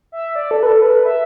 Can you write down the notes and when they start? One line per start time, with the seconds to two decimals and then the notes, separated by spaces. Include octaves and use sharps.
0.12 E5
0.35 D5
0.51 A4
0.63 B4
0.67 A4
0.82 B4
1.05 E5